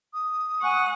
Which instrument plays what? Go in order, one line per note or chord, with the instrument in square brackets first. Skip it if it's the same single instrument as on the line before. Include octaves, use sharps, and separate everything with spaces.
[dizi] D#6
[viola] F#5 [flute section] G#5 C#6 F#6